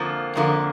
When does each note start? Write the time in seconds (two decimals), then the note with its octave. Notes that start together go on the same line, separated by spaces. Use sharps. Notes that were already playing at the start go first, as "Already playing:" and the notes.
Already playing: F2 D3 F3 A#3
0.36 F2 D3 F3 A#3